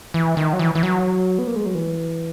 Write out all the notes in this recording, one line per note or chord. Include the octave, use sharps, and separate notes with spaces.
E3
D#3
F#3
E3
E3
F#3
B3
A#3
G#3
F#3
E3